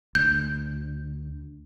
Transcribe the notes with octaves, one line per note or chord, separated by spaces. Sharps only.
D2 G6